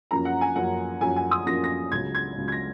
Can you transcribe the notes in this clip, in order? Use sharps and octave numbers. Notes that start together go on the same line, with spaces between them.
F#2 F3 A#3 C#4 A#5
F#5
G#5
F#2 F3 A#3 C#4 F#5
F#2 F3 A#3 C#4 G#5
G#5
D#6
F#2 F3 A#3 C#4 A#6
A#6
C#2 C#3 F#3 G#6
G#6
C#2 C#3 F#3
G#6
A#6